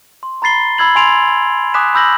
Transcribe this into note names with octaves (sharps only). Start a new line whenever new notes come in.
C6
A#5 B5 A6 C7 G7
B5 E6 G#6 F#7
G#5 C6 C7 D7 F7
G#5 D6 D#6 F#6 B6 E7
B5 E6 G6 A#6 F#7